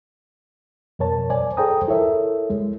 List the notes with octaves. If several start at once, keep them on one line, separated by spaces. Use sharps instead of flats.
F2 B2 A#4 C#5 A5
C5 D5 G#5
G#4 A4 C5 G5 A#5 D#6
E4 A4 A#4 C#5 E5
G#3